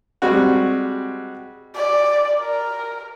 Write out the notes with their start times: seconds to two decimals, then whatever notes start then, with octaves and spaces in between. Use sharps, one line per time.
0.22 G3 G#3 C4 F#4
1.76 D5
2.41 A#4